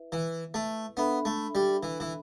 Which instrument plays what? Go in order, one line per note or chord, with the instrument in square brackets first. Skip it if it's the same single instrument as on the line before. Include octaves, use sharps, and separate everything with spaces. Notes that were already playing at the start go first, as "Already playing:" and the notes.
Already playing: [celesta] E4 B4 E5
[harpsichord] E3
A3
[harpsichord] B3 [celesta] D4 A4 E5 B5
[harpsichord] A3
G3
E3
E3